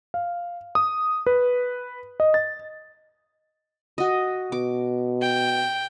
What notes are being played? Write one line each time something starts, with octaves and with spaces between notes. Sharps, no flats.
F5
D#6
B4
D#5
A6
F#4 D#5
B2 D6
G5